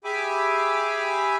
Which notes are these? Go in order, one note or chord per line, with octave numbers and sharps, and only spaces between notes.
G4 G#4 E5 G#5 B5 D6